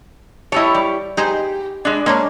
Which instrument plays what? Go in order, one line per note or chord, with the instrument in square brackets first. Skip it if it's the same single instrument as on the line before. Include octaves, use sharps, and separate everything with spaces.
[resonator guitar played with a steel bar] E4 G4 C#5 [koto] A4 D#5
[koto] G3
[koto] D#4 G#4 C5 [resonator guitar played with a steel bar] G4
[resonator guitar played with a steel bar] G#3 D4
[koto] G#3 C#4 D4 [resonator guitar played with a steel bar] A#3